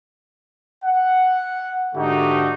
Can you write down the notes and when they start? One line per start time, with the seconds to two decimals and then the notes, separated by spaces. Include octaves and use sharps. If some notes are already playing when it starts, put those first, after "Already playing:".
0.85 F#5
1.95 G#2 D3 A3 D#4 F#4 G4